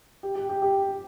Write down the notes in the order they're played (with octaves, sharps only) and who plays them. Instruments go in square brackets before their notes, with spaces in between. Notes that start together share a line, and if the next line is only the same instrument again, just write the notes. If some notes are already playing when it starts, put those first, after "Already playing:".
[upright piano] G4
G4
G4
G4